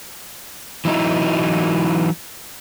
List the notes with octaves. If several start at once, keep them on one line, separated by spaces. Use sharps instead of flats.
E3 F#3 D#4 E4